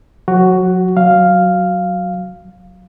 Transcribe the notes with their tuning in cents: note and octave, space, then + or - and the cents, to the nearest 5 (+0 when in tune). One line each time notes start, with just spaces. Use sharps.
F#3 -35 F#4 +10
F#3 +0 F5 +0